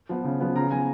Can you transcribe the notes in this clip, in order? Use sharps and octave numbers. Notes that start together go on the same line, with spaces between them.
F3 B3
C#3
F3 B3
C#3 A#5
F3 B3 G#5